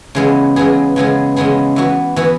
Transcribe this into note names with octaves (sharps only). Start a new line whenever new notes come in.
C#3 E3 G#3 B3 G#4
C#3 E3 G#3 B3 G#4
C#3 E3 G#3 B3 G#4
C#3 E3 G#3 B3 G#4
E3 B3 F#4 B4
E3 B3 F#4 B4